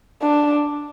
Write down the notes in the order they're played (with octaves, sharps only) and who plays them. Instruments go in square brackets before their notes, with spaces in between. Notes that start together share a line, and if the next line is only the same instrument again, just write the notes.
[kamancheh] D4